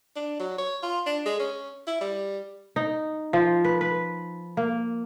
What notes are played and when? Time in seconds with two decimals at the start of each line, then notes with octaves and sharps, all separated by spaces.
0.16 D4
0.40 F#3
0.58 C#5
0.83 F4
1.06 D4
1.26 G#3
1.40 C#4
1.87 E4
2.01 G3
2.76 D#4
3.33 F3
3.65 B4
3.81 B4
4.57 A#3